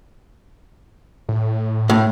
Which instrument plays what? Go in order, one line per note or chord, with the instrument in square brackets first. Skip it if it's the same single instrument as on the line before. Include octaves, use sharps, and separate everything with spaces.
[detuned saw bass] A2
[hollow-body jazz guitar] A2